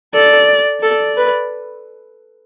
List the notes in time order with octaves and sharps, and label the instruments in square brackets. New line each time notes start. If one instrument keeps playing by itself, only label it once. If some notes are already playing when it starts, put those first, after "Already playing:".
[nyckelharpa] A4 [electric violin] D5
[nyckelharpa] A4 [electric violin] D5
[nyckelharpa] B4